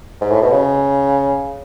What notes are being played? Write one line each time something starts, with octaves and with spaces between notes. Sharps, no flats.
G#2
A2
B2
C#3